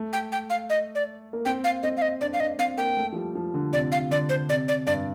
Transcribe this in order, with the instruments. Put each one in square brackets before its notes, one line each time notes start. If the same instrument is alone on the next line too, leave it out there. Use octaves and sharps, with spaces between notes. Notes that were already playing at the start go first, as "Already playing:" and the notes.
Already playing: [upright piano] A3
[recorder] G5
G5
F5
D#5
D5
[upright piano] A#3
[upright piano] C4 [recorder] G5
[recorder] F5
[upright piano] C4 [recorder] D#5
[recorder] F5
D#5
[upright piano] D4 [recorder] D5
[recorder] F5
[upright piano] D4 [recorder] D#5
[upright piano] C4 [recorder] F5
[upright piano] A#3 [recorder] G5
[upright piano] A3
F3
G3
F3
D3
[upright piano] C3 [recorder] D5
[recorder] F5
[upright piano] D3 [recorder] D5
[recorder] C5
[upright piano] C3 [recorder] D5
[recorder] D5
[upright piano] G2 [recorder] D5